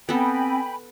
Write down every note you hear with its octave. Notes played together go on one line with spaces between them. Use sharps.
B3 C4 A4 G5 G#5 B5